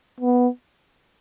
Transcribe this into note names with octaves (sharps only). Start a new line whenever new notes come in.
B3